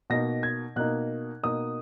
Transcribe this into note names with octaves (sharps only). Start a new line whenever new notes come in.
B2 A#3 D#4 A#6
G#6
B2 A#3 D#4 F#6
B2 A#3 D#4 D#6